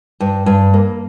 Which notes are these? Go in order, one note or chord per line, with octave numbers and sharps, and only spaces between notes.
G2
G2
A#3